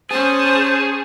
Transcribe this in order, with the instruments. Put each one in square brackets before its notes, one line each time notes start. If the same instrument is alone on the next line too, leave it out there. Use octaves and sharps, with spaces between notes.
[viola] C#4 A5 [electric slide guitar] G#4 [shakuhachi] C5